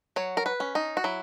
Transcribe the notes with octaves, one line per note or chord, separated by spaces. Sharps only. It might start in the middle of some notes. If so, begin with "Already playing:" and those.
F#3 C#5
A#4
B4
C#4
D#4
F#4
F#3 E4